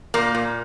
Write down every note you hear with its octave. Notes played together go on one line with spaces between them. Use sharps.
A#2 A#3
A#2